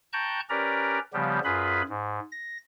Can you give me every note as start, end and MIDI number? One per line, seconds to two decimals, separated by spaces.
0.13 0.40 79
0.13 0.40 81
0.13 0.40 82
0.13 0.40 85
0.13 0.40 90
0.13 0.40 91
0.50 0.99 61
0.50 0.99 67
0.50 0.99 70
0.50 0.99 71
0.50 0.99 74
0.50 0.99 82
1.13 1.39 49
1.13 1.39 53
1.13 1.39 55
1.13 1.39 59
1.13 1.39 67
1.44 1.82 42
1.44 1.82 65
1.44 1.82 68
1.44 1.82 71
1.44 1.82 83
1.89 2.19 44
2.32 2.58 94